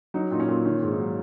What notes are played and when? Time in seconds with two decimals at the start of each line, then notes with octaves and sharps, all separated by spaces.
0.14 F#3 D#4
0.31 A#2 D#4
0.40 C#4
0.48 A#2
0.65 D#3 C#4
0.83 G#2
0.91 D#4
1.00 F#3